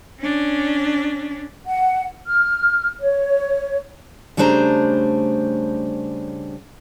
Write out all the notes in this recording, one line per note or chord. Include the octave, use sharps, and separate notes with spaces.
C#4 D4
F#5
F6
C#5
C#3 G3 A3 D4 C5 A#5